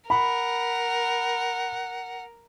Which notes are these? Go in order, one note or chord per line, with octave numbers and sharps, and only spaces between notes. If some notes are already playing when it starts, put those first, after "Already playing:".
A#4 F#5 B5